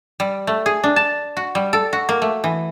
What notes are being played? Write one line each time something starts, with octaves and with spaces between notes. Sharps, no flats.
G3
A3
G#4
D4
A5
F#4
G3
A4
F#4
A#3
A3
E3